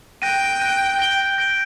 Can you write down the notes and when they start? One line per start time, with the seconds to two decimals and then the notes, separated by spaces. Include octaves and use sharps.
0.22 G5 F#6 A#6 D#7
0.60 F#6 A#6 D#7
0.99 G6 A#6 D7 G7
1.38 G6 A#6 D7 G7